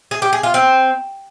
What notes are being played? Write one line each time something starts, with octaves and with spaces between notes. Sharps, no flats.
G#4
G4
G#4
F4
C4